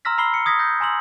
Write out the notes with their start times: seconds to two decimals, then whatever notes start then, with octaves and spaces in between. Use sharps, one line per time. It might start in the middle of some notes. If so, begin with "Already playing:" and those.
0.05 A#5 C6 E6 F6 A#6 B6
0.18 A#5 B5 E6 C7 G7
0.34 C#7
0.46 D#6 G#6 A#6 B6
0.59 G6 A#6
0.80 G#5 A#5 C6 E6 F#7